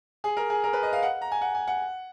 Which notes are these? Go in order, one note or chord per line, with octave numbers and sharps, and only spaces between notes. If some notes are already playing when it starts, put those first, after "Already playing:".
G#4
A#4
G#4
A#4
B4
D#5
F5
F#5
A#5
G#5
F#5
G#5
F#5